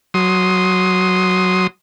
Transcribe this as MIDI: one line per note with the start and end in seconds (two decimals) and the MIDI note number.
0.14 1.67 54
0.14 1.67 84
0.14 1.67 87